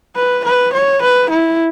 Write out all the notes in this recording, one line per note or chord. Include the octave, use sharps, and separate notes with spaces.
B4
B4
C#5
B4
E4